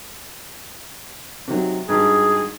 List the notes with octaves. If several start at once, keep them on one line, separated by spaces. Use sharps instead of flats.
C3 D#3 F#3
G#1 G2 G#4